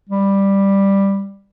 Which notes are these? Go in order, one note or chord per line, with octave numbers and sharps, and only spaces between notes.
G3